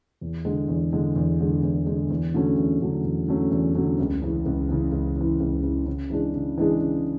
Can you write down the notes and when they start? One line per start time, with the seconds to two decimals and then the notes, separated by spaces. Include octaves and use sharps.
0.21 E2
0.45 D3 G#3
0.68 E2
0.93 D3 G#3
1.16 E2
1.40 D3 G#3
1.63 E2
1.86 D3 G#3
2.10 E2
2.34 D3 F#3 A3 C#4
2.57 E2
2.81 D3 F#3 A3 C#4
3.04 E2
3.28 D3 F#3 A3 C#4
3.51 E2
3.75 D3 F#3 A3 C#4
3.99 C#2
4.22 C#3 E3
4.46 C#2
4.69 C#3 E3
4.92 C#2
5.16 C#3 E3
5.40 C#2
5.63 C#3 E3
5.86 C#3
6.10 E3 G#3 D4 G#4
6.34 C#3
6.57 E3 G#3 D4 G#4
6.81 C#3